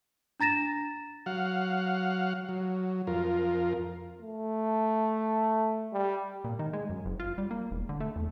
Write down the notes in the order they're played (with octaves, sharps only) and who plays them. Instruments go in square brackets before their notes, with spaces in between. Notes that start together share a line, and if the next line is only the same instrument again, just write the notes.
[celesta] D4 A#5 A6 A#6 E7
[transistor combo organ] F#3 F5 F#5
F#3
F2 F4 A#4
[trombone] A3
G3
[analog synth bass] A#2
D#3
G#3
F#2
F#1
F4
G3
A#3
E1
D3
A3
E2